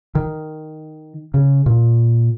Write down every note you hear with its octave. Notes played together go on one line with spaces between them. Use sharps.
D#3
C#3
A#2